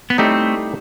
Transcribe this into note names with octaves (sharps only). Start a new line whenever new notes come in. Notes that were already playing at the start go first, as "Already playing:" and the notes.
B3
A2 G3 A3 C4 D#4 G4